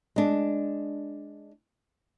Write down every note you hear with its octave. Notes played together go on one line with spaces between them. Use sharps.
G#3 D4